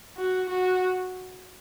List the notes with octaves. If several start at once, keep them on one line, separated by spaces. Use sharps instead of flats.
F#4
F#4